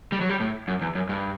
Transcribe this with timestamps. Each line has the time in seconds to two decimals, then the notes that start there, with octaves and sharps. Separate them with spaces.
0.12 G3
0.21 F#3
0.29 G3
0.40 A2
0.68 F#2
0.81 E2
0.95 F#2
1.09 G2